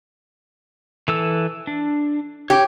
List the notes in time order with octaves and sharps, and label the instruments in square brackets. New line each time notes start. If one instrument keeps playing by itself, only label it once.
[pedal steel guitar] E3 A4 E6
D4
[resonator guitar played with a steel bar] G4 [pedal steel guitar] C#5